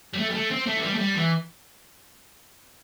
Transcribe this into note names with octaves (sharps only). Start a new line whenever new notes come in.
G3
A3
G3
A3
C4
A3
E3
G3
A3
G3
E3